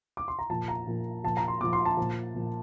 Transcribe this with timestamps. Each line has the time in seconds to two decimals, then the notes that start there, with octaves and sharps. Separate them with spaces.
0.17 D6
0.28 C6
0.39 A#5
0.50 A#2 F3 A5
0.68 A#5
0.87 A#2 F3
1.24 A#2 F3 A5
1.37 A#5
1.48 C6
1.61 A#2 F3 D6
1.73 C6
1.85 A5
1.97 A#2 F3
2.34 A#2 F3